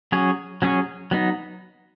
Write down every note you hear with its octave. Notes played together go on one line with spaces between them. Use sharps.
F#3 C#4 G#4 C#5
F#3 C#4 G#4 C#5
F#3 B3 D#4